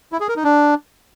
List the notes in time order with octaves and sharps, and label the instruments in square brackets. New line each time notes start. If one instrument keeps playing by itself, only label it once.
[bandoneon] E4
G#4
A#4
D#4
D4